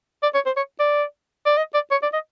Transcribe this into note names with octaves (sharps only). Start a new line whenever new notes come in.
D5
C#5
C5
C#5
D5
D5
D#5
D5
C#5
D5
D#5